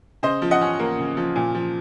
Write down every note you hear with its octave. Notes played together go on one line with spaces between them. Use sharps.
C#3 C5 D#5
F3
D#5 F#5
C#4
A#3
C#3
F3
A#2
F3